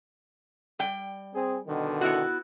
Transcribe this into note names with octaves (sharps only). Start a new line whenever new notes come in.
G3 G5
C4 G#4
B2 D3 D#3
B3 E4 F#4